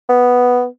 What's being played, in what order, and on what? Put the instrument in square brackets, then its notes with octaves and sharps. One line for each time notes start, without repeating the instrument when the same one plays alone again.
[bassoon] B3